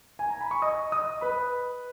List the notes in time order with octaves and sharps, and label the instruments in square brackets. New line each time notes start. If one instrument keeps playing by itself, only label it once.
[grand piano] G#5
A#5
B5
C#6
D#5 D#6
D#5 D#6
B4 B5